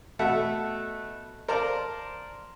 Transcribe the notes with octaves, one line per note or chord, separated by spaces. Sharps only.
B2 A3 E5 F#5 A5
A#4 C5 D5 F5 A5 A#5